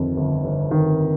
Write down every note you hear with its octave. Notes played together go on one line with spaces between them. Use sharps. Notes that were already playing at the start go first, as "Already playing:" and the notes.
Already playing: G1 F2 D#3
G1
G1
D#3